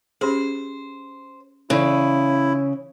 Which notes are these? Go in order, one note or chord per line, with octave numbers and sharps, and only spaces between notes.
C#4 G4 G#4 C5
C#3 E3 E4 A4 D5